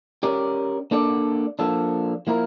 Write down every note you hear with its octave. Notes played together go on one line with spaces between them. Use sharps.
C#4 G4 A#4 D5
A#3 D4 A4 D5
F3 A#3 D4 A4
F3 A#3 E4 A#4